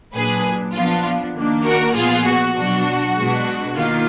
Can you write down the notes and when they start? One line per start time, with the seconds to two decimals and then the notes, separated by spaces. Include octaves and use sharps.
0.14 A#2 F#3 D4 G#4 B4
0.75 F3 B3 D4 F4
1.35 D#3 A#3 D4
1.65 F#4 A#4
1.95 A#2 F3 B3 F4 G#4
2.26 F#4
2.56 B2 F#3 D4 F#4
3.16 B2 G#3 D4
3.76 D#3 A#3 D#4 F4